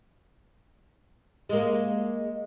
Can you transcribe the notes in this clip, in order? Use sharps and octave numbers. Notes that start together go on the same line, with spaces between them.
G#3 A#3